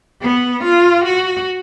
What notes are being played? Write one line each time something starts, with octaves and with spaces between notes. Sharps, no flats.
B3
F4
F#4